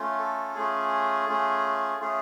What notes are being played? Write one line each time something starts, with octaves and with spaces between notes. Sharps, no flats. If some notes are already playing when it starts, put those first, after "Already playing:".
Already playing: A3 C#4 F4
A4
A3 C#4 F4 G#4
A3 C#4 F4
A3 C#4 F4 G#4